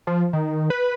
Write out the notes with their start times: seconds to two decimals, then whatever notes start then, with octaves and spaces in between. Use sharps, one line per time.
0.07 F3
0.33 D#3
0.70 B4